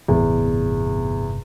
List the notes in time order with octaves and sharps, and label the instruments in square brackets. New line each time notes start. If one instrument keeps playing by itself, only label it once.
[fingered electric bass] G1 A2 C3 [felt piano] E2